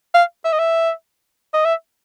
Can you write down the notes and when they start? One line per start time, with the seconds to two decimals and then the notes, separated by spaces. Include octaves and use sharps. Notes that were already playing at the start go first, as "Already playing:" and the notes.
0.14 F5
0.44 E5
0.52 D#5
0.59 E5
1.54 D#5
1.65 E5